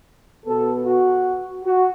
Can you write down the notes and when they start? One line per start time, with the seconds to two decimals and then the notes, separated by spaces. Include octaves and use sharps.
0.46 B2 B3 A4
0.86 F#4
1.65 F#4